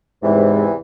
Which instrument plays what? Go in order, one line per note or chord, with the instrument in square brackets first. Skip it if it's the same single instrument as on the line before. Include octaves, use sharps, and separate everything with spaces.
[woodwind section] E2 C3 E3 [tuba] G#2